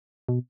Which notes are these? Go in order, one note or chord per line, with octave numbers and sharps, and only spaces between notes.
B2